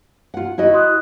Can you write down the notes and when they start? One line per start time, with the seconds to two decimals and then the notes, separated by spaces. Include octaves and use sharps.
0.34 F4 F#5
0.58 E4 F#4 D#5
0.73 C6 D#6 F#6